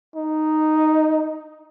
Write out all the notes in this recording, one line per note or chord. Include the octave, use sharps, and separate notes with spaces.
D#4